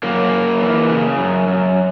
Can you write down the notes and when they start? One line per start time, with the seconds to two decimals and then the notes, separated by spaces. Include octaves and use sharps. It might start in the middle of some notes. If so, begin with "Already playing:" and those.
0.03 F#2 A#3
0.31 F#2
0.60 E3
0.89 C#3
1.18 F#2
1.48 F#2